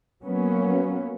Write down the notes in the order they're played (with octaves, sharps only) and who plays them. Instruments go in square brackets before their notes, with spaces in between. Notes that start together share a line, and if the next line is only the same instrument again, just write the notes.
[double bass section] F#3 A#3 B3 C#4